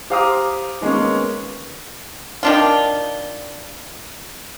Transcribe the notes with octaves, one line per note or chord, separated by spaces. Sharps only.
G4 C5 F5 A#5 D6 D#6
D#3 G#3 A#3 B3 C#4
D#3 D4 F4